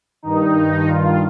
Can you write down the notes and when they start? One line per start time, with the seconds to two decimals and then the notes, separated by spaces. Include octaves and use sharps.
0.23 G2 D#3 D#4
0.86 F4